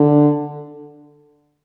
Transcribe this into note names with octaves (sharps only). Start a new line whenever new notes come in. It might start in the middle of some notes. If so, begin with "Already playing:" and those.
Already playing: D3